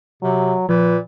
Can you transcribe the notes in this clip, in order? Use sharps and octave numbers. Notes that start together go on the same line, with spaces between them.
C3 F#3
A#2 F3 B4